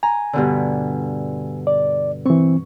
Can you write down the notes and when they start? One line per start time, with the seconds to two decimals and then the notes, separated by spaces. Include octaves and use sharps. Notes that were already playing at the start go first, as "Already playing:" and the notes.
0.03 G#5 A#5
0.33 G2 B2 D3
1.67 D5
2.26 E3 C4 C#6